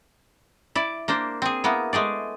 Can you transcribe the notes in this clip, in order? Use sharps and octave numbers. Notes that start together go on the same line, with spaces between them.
E4 D5
A#3 D4 C5
C4 G#4
A#3 B3 E4
G#3 A3 G#4 D5